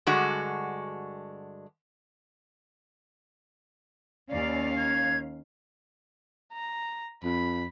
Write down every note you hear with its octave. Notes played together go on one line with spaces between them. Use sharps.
G2 D3 G#3 F#4
D#2 C#4 D5 F5
G#6
A#5
F2 B5